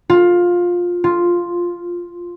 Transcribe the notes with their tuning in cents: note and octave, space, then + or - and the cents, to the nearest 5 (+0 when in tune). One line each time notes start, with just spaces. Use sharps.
F4 +15
F4 +0